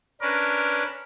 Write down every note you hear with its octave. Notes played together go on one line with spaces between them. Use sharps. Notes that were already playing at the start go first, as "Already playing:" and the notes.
C#4 D4 A#4 B4